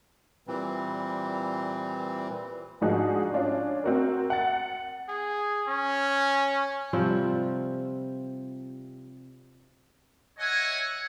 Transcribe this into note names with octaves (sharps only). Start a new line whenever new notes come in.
A#2 E3 G3 C4
G#2 F3 D4 D#4 F#4 G#4
C#4 D4 F4
C4 F#4 A#4
F#5 A6
G#4
C#4
C3 F3 G3 C4
C#5 D#5 E5 F#5 G#5